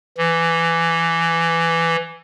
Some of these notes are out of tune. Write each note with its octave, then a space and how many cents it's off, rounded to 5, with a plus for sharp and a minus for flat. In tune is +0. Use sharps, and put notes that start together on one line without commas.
E3 +15